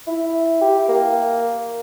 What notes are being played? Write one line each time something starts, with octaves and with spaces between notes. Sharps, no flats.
E4
G4
A#3